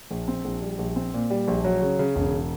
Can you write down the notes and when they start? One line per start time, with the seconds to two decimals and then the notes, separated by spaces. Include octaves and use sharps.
0.11 A#1
0.28 C4
0.44 A#1
0.62 G3
0.79 A#1
0.96 C4
1.14 A#2
1.30 G3
1.48 A#1
1.65 F#3
1.82 C#3
1.99 C#3
2.16 E1